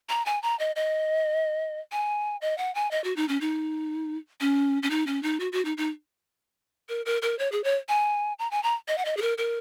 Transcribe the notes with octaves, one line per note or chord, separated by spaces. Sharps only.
A#5
G#5
A#5
D#5
D#5
G#5
D#5
F#5
G#5
D#5
F#4
D#4
C#4
D#4
C#4
C#4
D#4
C#4
D#4
F#4
F#4
D#4
D#4
A#4
A#4
A#4
C#5
G#4
C#5
G#5
A#5
G#5
A#5
D#5
F#5
D#5
G#4
A#4
A#4